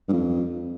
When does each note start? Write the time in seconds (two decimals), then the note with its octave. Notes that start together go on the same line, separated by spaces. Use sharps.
0.09 G2
0.13 F2